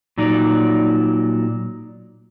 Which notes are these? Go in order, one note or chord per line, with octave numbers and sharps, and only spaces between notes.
A#2 F#3 D#4 D5